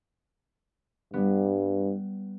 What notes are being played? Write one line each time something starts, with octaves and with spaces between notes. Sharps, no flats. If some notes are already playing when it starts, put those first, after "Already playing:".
G2 G3 B3